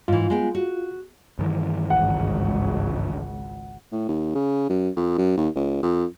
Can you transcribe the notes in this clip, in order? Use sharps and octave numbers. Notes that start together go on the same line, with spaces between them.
G#2 E3 F4
G#3 B3 G5
F#4
G2 D#3 E3
G#1 C#2 F#5
A2
D#2
C#3
F#2
F2
F#2
D#2
C#2
F2